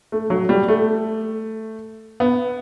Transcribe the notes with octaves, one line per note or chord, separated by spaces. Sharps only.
A3
F#3
G3
A3
B3